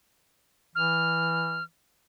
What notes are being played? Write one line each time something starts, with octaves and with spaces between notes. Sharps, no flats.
E3 F6